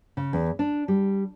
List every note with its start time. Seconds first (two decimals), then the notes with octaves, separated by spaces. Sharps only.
0.17 C#3
0.33 E2
0.59 D4
0.88 G3